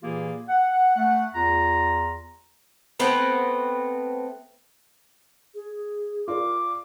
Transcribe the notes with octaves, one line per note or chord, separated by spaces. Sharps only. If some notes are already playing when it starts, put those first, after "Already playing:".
A#2 E3 A#3 F4 G4 G#4
F#5
A3 F#5
E2 F4 A#5
A3 B3 C4 B4
G#4
F4 A#4 D5 D6